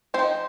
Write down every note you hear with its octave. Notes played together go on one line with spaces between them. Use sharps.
F3 C4 C5
D#4